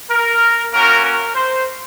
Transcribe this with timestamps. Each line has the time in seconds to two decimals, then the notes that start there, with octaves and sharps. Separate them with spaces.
0.10 A#4
0.72 A#3 C#4 F#4 A#4
1.03 A#4
1.35 C5